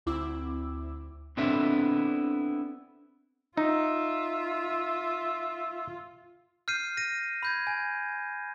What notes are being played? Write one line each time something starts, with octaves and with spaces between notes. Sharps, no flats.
D2 C4 E4 D6 E6
B3 C4 D4 E4 A4 E5
D#4 F4 E5
F6 G6 C7 D#7
A#6 D#7
B5 G6 G#6
G#5